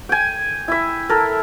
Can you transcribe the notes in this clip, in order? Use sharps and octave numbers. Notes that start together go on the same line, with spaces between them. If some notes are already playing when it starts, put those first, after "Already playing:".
G5 G#5
E4 E5
A4 A#4